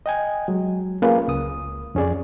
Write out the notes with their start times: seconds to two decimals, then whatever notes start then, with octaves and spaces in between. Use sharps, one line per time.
0.06 D#5 G5 G#5
0.48 F#3 G#3
1.02 A#3 C#4 F4 G#4 A#4 B4
1.28 C#2 D#6
1.95 F2 C#4 G#4 D5